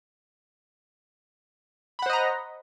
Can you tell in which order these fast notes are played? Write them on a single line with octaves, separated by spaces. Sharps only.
B5 F#5 C5 D#5 A#5